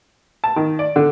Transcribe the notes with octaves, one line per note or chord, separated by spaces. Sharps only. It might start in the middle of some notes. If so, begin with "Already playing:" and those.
A5
D#3
D5
D3